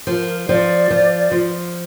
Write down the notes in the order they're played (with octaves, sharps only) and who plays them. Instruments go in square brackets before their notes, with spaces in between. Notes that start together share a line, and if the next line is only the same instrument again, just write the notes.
[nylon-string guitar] F3 [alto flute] A#4
[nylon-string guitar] F3 [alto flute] D5
[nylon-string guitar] F3
F3